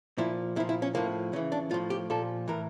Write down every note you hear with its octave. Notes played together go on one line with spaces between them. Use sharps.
A#2 F3 E4
A#2 F3 E4
E4
C#4
A2 F3 A#3
C#3 E3 C#4
D4
A2 F3 F4
G4
A#2 F3 A4
A2 E3 A#4